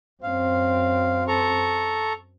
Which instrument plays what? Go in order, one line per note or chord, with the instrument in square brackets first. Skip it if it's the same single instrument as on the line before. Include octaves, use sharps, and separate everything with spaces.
[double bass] F#2 C4 [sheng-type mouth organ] F5
[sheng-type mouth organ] A4 A#5 C#6